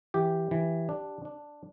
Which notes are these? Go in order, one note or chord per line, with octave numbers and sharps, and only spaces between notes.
E3 G4
E3
D4
D4